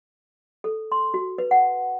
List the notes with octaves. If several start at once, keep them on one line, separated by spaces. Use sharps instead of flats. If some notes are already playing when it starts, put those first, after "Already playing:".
A4
C6
F#4
B4
F#5